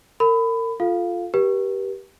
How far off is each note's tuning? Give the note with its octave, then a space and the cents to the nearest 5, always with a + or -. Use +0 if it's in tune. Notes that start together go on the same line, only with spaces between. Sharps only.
A#4 -35 B5 +20
F4 +0 A4 -10 F5 +0
G4 -5 B4 -45